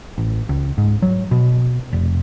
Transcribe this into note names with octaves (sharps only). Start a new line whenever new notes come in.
A1
C#2
G#2
F#3
B2
F1